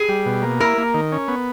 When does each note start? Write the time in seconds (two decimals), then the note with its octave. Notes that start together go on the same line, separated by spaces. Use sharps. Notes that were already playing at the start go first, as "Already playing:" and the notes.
Already playing: G#4
0.09 G3
0.26 B2
0.43 A#3
0.60 E4 A#4
0.78 A#3
0.94 D#3
1.12 C#4
1.28 B3